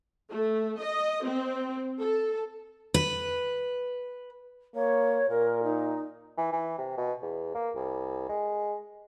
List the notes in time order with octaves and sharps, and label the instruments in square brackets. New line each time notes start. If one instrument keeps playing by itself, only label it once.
[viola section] A3
D#5
C4
A4
[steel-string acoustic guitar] B4
[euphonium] A#3 [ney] C#5
[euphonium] A#2 [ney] A#4
[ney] D#4
[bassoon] E3
E3
C3
B2
E2
A#3
C2
G#3